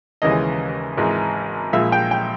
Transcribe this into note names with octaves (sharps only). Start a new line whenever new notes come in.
D#2 C#3 E3 G#3 D#5
G#1 G#2 E3 G#3
A#1 A#2 G#3 E5
G5
G5